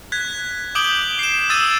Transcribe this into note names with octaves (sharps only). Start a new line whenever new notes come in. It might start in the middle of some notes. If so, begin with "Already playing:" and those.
F#6 G#6 B6
D6 D#6 G6 D7 F#7 G7
C7 E7
D#6 E6 A6 D#7 E7